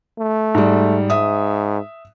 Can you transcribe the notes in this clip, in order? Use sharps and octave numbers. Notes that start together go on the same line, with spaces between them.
A3
G#2 G3
G#2 E5 D#6